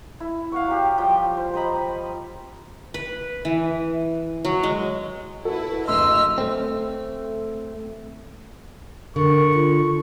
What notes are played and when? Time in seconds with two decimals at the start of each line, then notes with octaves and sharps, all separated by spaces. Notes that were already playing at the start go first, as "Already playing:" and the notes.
0.20 E4
0.52 F5 F#5 C#6
0.67 F#3 G4
0.98 F3 G3 G5
1.37 C5
1.54 C5 D#5 A#5 B5
2.94 B4
3.45 E3
4.45 F#3
4.63 G#3
5.45 E4 F#4 A4 B4
5.88 F#1 D2 D#5 E5 C6 E6 F6
6.38 A3 C4
9.16 D3 A#4 C#6
9.54 F4